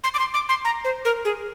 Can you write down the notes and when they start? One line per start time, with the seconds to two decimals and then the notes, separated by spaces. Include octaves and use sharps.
0.04 C6
0.14 D6
0.19 C6
0.34 D6
0.49 C6
0.65 A#5
0.84 C5
1.05 A#4
1.25 G#4